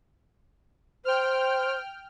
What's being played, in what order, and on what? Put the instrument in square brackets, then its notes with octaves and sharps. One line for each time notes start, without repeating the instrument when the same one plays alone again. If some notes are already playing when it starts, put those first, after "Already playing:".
[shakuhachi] C5 [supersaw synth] G5 F6